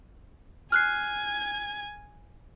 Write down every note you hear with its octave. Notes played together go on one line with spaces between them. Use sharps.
G#5 F6 F#6 G#6 C7